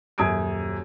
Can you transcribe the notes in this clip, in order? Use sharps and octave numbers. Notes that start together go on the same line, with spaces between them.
D#1 F#2 D#6 G#6 D7